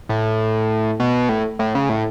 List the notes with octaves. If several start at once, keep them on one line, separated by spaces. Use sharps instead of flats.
A2
B2
A2
A2
C#3
A2